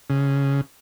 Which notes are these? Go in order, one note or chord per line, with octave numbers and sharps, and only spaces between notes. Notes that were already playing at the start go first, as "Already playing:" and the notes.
C#3